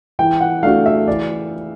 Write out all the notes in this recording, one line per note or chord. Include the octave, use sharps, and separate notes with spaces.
E3 G5
F#5
A3 D4 F#4 F5
E5
E3 D5